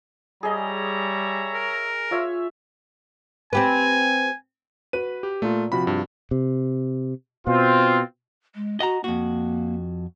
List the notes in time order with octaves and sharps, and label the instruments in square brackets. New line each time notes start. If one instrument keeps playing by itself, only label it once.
[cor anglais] G3 [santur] G#4 D#5 [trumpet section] C#5 E5 A#5
[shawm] A#4
[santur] F4 C#5 E5
[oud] C4 G4 B4 [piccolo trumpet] G#5
[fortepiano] F#4 B4 [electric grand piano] D#7
[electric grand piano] G4
[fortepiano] A#2 [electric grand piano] A3 F4
[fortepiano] C3 F3 F#4 [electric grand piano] B5
[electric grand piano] G2
[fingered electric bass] C3
[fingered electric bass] B2 [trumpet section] C4 F4
[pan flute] G#3
[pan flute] F#4 [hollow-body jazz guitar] D#5 F#5 A#5
[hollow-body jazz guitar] F2 F#4 [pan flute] A#3